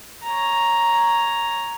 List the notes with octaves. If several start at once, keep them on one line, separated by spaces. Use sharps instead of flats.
C#5 A#5